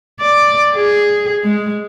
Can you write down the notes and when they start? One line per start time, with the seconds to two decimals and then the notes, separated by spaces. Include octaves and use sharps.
0.21 D5
0.74 G#4
1.44 G#3